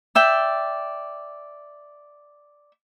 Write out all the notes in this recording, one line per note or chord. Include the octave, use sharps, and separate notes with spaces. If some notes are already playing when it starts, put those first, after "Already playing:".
D5 E5 G5